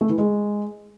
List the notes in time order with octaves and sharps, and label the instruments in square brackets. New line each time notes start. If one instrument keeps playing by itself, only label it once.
[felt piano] A3
E3
G#3